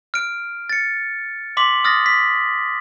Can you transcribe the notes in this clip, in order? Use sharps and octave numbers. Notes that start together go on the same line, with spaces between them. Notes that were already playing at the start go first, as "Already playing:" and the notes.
F6 D7
A6 C#7
C6 D6 B6 F#7
D#6 F6 A6 A#6
B6